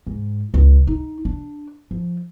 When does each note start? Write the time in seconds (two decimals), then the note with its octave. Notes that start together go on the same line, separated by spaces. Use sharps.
0.07 G#2
0.54 C#2
0.87 D#4
1.25 D4
1.91 F3